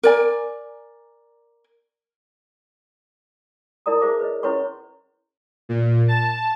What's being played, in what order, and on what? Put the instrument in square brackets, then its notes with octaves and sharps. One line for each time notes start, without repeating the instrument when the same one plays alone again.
[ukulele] A#4 D5 G#5
[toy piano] D#4 E4 A#4 D5 A#5 D#6
E4 G#4 C5 E5 D6
B4 C#5 D#5
C#4 E4 B4 C#5 C6 C#6
[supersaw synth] A#2
A5